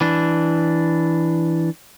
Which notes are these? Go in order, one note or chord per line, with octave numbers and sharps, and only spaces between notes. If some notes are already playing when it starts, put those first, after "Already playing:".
E3 D4